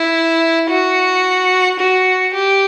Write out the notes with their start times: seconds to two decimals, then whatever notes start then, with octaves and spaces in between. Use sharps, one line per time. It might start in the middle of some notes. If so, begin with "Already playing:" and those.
Already playing: E4
0.70 F#4
1.79 F#4
2.34 G4